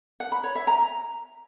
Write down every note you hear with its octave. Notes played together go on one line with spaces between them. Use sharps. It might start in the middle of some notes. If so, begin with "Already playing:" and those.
F#5
B5
C#5
E5
A#5